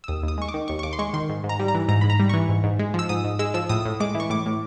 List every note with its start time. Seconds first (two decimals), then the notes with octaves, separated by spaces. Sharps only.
0.04 E6
0.08 D#2 D#6
0.23 D#2
0.28 D#6
0.38 G#3 C#6
0.48 D6
0.54 D#3
0.68 D#2 C#6
0.79 C#6
0.83 D#2 D6
0.93 C6
0.99 G#3 C#6
1.14 D#3 C6
1.29 G#2
1.44 G#2
1.49 A#5
1.59 G3
1.68 A#5
1.75 E3
1.88 G#2 A#5
2.01 G#2 B5
2.10 A#5
2.20 G3
2.29 E3 C#6
2.49 G#2
2.64 G#2
2.79 G#3
2.94 F3 E6
3.09 G#2 D#6
3.24 G#2
3.39 G#3 E6
3.54 F3 E6
3.69 A2 D#6
3.86 A2
4.00 G#3 D6
4.15 E3
4.20 C#6
4.30 A2 D6
4.46 A2